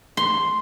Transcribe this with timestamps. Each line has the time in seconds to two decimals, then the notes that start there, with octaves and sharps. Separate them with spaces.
0.17 C6